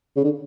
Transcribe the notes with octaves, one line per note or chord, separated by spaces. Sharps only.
C#3
D3